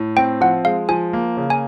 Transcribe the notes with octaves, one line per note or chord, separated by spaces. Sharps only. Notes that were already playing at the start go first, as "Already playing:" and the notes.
Already playing: A2
C4 G5
F3 F#5
G#3 F5
F3 G#5
A#3
C#3
G#5